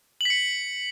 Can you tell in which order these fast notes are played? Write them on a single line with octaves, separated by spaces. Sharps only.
F#7 B6 C#7